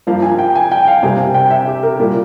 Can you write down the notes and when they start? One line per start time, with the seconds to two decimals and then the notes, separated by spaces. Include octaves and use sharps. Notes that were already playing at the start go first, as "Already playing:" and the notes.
0.07 G2 F3 A#3 F5
0.22 G#5
0.39 G5
0.55 G#5
0.72 G5
0.88 F5
1.03 C3 G3 A#3 G#5
1.19 G5
1.34 G5
1.50 E5
1.67 G4
1.83 A#4
1.99 A#2 G3 A#3 A#4